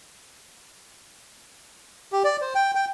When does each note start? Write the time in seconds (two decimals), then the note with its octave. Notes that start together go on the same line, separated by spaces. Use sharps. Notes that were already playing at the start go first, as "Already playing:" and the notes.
2.12 G4
2.24 D5
2.42 C5
2.55 G5
2.75 G5